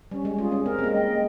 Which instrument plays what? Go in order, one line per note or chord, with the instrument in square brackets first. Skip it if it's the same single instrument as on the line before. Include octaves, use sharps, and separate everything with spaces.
[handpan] G3 [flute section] C#4
[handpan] G#3
[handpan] G#3 [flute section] F4
[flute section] G#4
[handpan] C#4
[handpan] C4 [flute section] A#4
[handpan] G#3
A#3
[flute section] D#5 G5